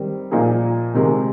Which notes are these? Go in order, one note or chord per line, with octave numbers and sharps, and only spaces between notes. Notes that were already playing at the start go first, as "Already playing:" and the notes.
Already playing: D#3 G3 C4
A#2 F3 A#3 D#4 G#4
C3 D#3 G#3